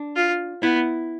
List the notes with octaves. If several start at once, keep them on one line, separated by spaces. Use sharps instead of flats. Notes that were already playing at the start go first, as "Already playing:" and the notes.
Already playing: D4
F4
B3 E4